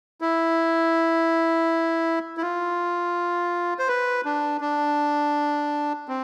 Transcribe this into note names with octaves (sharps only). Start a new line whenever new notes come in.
E4
E4
F4
C5
B4
D4
D4
C4